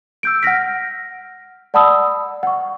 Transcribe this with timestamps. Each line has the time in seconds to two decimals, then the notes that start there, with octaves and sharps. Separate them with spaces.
0.23 E6 G6 D7
0.43 F#5 F6 A#6 B6
1.74 D5 F#5 A5 B5 D#6 E6
2.43 F#5 C#6